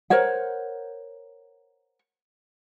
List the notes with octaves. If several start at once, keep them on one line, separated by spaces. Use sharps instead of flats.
A#4 C5 C#5 F#5